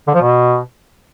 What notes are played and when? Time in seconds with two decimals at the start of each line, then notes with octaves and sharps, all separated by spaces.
0.08 D3
0.14 F3
0.21 B2